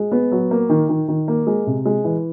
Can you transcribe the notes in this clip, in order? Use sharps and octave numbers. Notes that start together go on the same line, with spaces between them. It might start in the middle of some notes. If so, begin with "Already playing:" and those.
Already playing: G#3
B3
F#3
A#3
D#3
D#3
D#3
A#3
G#3
C3
G#3
E3